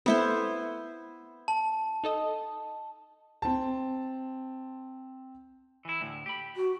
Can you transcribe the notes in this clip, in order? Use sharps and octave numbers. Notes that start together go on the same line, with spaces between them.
A3 B3 C4 E4 C5
A5
D#4 A4 D#5
C4 A5
E3 E4
D2 A2
G4 B5
F#4